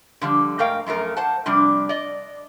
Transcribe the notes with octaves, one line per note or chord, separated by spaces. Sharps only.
D3 F3 G3
G#2 A3 A#4 F5 G5
F#2 F3 A3 A#4
C5 F#5 A5
C3 F3 G3 D4
D5 D#5